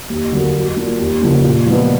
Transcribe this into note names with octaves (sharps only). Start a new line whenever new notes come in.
D#2
D3 F#3 A#3
F#3
A#3 D4 F4
D#2
C#3 F3 A#3 D4
A#2
F3 G#3 B3 D4